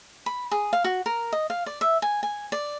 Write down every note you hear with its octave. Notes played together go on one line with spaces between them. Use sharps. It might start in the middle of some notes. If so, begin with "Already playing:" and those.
B5
G#4
F5
F#4
A#4
D#5
F5
D5
E5
G#5
G#5
D5